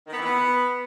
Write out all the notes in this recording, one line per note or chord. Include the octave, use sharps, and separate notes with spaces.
D#3
B3
E3
B3